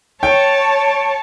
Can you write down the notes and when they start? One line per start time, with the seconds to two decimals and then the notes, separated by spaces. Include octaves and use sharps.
0.23 C#5 G5 A5